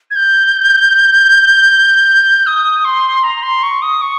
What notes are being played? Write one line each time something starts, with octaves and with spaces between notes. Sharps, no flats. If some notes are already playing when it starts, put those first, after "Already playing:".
G#6
G6
D#6
C6
A#5
C6
C#6
D#6
C#6